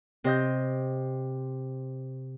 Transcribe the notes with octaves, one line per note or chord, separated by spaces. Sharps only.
C3 D#5 G6